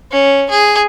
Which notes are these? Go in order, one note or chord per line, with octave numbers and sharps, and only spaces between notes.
C#4
G#4